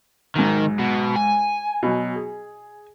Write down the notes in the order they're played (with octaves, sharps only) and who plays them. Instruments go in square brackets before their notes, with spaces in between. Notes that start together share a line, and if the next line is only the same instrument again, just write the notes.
[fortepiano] B1 G#2 [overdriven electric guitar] D#3
[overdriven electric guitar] B2
G#5
[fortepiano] B2 F#3
G#4